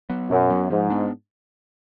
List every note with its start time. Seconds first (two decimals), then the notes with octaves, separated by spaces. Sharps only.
0.10 F#3 B3
0.30 F#2 B2
0.50 F#3 B3
0.70 G#2 F3
0.90 B3 D4